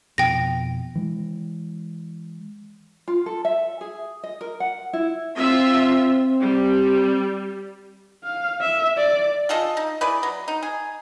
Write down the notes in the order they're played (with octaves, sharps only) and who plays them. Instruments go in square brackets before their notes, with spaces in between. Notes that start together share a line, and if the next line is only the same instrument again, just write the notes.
[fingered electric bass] F2 B2 [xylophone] G5 A#6
[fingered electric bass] E3 G#3
[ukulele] F4
A4
E5
G#4
D#5
A#4
F#5
E4
[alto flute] C4 [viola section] F4 E5
[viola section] G3
[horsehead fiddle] F5
E5
D5
[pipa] F4 G#4 A4 D#5
D#4
E4 G#4 B4 D5
F#3
D#4
G#4